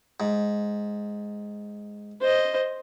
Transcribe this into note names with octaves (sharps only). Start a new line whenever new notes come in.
G#2
C5 D#5